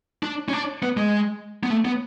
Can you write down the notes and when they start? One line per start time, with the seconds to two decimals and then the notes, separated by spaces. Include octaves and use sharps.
0.23 D4
0.49 C#4
0.53 D4
0.83 B3
0.97 G#3
1.63 B3
1.70 A3
1.85 B3